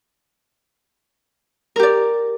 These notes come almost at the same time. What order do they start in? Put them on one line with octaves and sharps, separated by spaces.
A#4 G4 D5